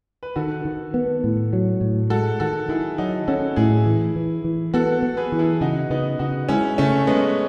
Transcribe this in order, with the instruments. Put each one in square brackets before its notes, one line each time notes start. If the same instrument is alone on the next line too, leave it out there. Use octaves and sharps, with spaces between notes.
[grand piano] B4
[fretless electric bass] D#3 [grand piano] F#4 A4
[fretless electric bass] D#3
B3
A2
F#3
A2
[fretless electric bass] G#3 [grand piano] F#4 A4
[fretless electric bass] D#3 [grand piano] F#4 A4
[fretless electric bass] D#3 [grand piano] E4 G#4
[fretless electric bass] F#3 [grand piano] D#4 F#4
[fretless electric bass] C#4 [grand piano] F#4 A4
[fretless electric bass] A2 [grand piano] E4 G#4
[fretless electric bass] E3
E3
E3
[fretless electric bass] B3 [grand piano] F#4 A4
[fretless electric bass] B3
[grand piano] G#4 B4
[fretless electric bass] E3
[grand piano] E4 G#4
[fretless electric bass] C#3 [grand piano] D#4 F#4
[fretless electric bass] C#3 [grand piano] B3 D#4
[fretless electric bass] C#3 [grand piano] D#4 F#4
[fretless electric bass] G#3 [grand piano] C#4 E4
[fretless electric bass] C#3 [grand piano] A3 C#4
[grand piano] G#3 B3 [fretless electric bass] C#4